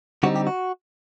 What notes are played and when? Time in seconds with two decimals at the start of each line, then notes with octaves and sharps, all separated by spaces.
0.23 D3 G3 C4 D#4 F#4
0.36 G4
0.47 F#4